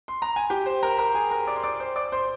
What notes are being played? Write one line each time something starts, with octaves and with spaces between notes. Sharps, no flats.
C6
A#5
G#5
G4 G5
C5
A#4 A#5
A#4 A#5
G#4 G#5
A#4 A#5
D5 D6
C6
D5 D6
C5 C6
D5 D6
C5 C6